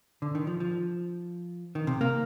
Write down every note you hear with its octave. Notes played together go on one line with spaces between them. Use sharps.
D3
D#3
F3
F3
D#3
C3
A#3